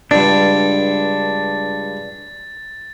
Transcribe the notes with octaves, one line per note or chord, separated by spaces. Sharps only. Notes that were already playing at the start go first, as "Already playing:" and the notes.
C#2 G2 D4 D5 A6